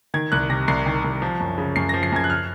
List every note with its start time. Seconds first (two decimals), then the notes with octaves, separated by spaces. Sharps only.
0.14 D#3 G#6
0.32 C2 F#6
0.49 C3 A#6
0.68 C2 C7
0.86 D#3
1.04 C2
1.22 F3
1.40 F#2
1.58 C#3
1.76 F#2 C7
1.89 A#6
1.94 F3
2.03 C7
2.12 F#2 G#6
2.24 F#6
2.30 F6